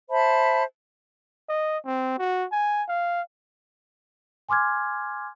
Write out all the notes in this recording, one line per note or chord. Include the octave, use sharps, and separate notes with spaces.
C5 E5 A5 B5
D#5
C4
F#4
G#5
F5
G#5 C6 D6 F6 G#6